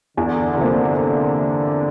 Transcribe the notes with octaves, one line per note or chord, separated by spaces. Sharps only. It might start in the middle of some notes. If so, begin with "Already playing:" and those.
E2 D3
C3 F3 A#3